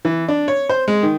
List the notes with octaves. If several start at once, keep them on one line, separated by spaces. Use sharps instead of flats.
E3
D4
C#5
C5
G#3
D#3